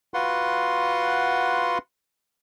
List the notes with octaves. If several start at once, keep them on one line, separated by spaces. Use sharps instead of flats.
F4 F#4 B4 F#5 C6